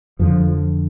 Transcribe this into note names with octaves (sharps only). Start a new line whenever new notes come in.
F2 D3 F3